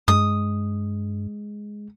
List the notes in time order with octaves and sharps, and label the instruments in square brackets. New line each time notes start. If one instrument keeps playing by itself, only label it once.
[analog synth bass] G2 [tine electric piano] G#3 [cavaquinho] D#6